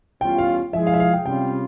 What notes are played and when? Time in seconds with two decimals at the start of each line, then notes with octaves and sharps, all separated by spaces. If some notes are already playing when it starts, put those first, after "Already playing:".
0.21 E2 E3 G3 C#4 F4 G5
0.38 F5
0.73 F3 G#3 E4 G#4 E5
0.87 F5
0.94 E5
1.00 F5
1.13 G5
1.26 C3 G3 C#4 F4 G5